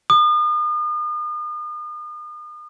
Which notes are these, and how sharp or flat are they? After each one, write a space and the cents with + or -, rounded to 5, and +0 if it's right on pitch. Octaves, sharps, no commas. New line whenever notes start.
D#6 -40